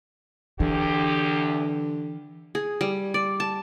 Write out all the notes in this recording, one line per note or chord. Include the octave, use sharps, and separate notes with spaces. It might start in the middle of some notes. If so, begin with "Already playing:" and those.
E2 D3 E3 G4
G#4
G3
D5
A5